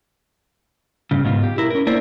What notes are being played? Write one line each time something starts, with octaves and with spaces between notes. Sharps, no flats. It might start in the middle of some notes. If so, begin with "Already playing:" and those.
G2 C#3
G#2 B2 F4
G4
E4 A#4
C#4 A#4
A#3 D4 E4 A#4 C5